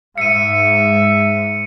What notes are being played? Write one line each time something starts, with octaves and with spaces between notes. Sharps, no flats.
G#2 E5 C#7 D#7